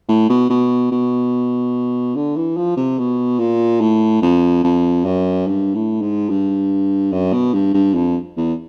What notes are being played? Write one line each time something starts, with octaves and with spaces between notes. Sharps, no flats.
A2
B2
B2
B2
D3
E3
F3
C3
B2
A#2
A2
F2
F2
F#2
G2
A2
G#2
G2
F#2
B2
G2
G2
F2
E2